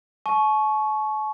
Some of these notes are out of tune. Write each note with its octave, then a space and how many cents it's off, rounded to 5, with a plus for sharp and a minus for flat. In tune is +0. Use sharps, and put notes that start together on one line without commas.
A5 -45 C#6 +0